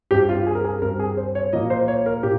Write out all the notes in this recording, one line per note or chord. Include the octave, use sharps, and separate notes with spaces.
G2 G3 C4 G4
F4
G#4
A#4
G#4
G2 G3 C4 A#4
G#4
C5
C#5
A#2 F3 A#3 D#5
C5
C#5
A#4
A#2 G4